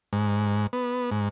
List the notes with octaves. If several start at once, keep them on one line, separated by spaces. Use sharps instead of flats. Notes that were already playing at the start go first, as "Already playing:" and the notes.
G#2
B3
G#2